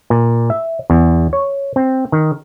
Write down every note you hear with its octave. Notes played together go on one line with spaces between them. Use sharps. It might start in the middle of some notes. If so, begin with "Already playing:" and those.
A#2
E5
E2
C#5
C4
D#3